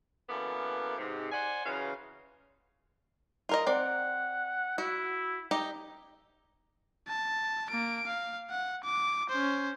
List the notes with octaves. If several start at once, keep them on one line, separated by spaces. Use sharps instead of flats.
F#2 E3 A#3 B3 A4 D5
G#2 C3
C5 D5 F#5 G#5
F#2 C#3 E3 F4 F#4 F5
F4 A#4 D#5
C4 D5 F#5
E4 F#4
D#4 G4 D#5
A5
A#3 D7
F5
F#5
D6
C#4 C5